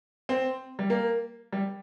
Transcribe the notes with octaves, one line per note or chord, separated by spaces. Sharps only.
C4
G3
A#3
G3